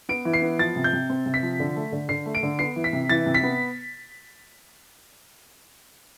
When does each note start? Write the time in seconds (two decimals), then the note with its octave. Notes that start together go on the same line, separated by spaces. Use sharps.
0.09 B3 D7
0.25 E3
0.33 C7
0.42 B3
0.59 F3 A6
0.76 C3
0.84 G6
0.93 C3
1.09 C4
1.26 C3
1.34 B6
1.42 F3
1.59 D3
1.76 A3
1.92 D3
2.09 D3 C7
2.26 A3
2.35 D7
2.43 D3
2.59 B3 C7
2.76 E3
2.84 B6
2.93 C3
3.09 E3 A6
3.26 C3
3.34 B6
3.43 B3